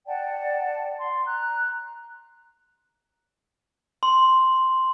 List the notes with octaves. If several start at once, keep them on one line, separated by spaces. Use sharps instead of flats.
D5 F#5 G5 A5
C6
A#5 F#6
C6